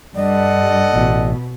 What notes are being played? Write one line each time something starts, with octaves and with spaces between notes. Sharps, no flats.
G2 A4 D5 D#5 F#5
A1 B2